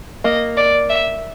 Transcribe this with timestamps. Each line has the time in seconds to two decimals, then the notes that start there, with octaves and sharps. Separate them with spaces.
0.24 A#3 D#5
0.57 D5
0.89 E5